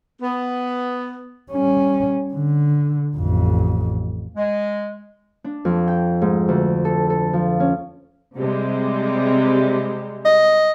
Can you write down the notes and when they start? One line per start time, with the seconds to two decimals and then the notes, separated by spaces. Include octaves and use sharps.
0.22 B3
1.51 G3 C#4
2.34 D3
3.17 A1 F2
4.37 G#3
5.44 D4
5.65 F2
5.88 G5
6.22 G#2
6.49 D2
6.85 A4
7.10 A4
7.33 F3
7.60 C#4
8.36 C3 G3 G#3
10.25 D#5